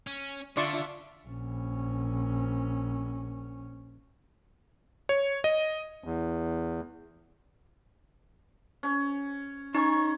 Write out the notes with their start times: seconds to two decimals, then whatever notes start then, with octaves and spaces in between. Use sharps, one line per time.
0.07 C#4
0.57 D3 D4 F4 D5 E5 C6 C#6
1.27 A#1 C#4
5.09 C#5
5.44 D#5
6.04 E2
8.83 C#4
9.75 C#4 D#4 C#6